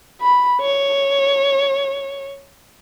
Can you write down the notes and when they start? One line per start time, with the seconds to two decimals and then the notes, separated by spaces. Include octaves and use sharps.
0.21 B5
0.61 C#5